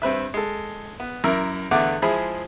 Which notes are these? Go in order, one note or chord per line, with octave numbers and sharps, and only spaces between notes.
G2 C4 B4 E5
G#3 A4
B3
F#2 E4 A#4 E6
E2 D3 A3 B3 F#5 D6
F3 G#3 E4 G#4 B5